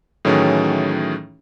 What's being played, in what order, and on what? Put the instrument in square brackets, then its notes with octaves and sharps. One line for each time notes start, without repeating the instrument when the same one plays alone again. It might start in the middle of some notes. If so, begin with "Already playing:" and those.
[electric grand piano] A2 D#3 E3 F#3 C#4 G#4